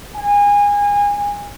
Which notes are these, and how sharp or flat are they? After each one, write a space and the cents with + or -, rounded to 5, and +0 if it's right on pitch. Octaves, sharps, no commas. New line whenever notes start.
G#5 -25